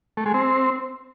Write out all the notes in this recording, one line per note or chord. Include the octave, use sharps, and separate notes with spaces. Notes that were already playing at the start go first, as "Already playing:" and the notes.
A3
G#3
C4